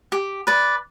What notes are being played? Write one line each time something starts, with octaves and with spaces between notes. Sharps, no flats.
G4
B4 D5